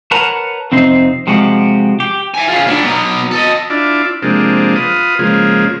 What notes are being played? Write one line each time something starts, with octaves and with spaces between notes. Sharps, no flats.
A#4 B4 C#5 F#5 A5 A#5
F2 C3 C4 D#4 C5
C3 F3 G#3 F#4 G4
G4
E5 G#5
F4 G#4
B3 D4
F#3 B3
A4 D#5
D4 E4 F4 D5
C3 F3 G#3 A#3 D4
F4 B4 D#6
C#3 F3 G#3 A#3